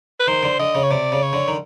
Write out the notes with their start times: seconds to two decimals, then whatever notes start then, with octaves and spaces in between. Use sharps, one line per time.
0.20 B4
0.28 D#3 C5
0.43 D3
0.59 D3 D#5
0.75 C#3
0.83 C#5
0.91 C3 D5
1.12 C#3
1.22 C#5
1.33 D3
1.48 D#3